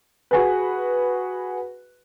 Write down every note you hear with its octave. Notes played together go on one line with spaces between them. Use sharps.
F#4 G#4 B4